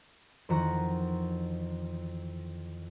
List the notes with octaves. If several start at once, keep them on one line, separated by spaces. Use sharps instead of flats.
F2 D#3 E3 F#4 F#5 A#5